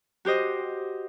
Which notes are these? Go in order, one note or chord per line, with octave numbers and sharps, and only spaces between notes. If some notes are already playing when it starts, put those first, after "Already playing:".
F#4 G4 C5 D#5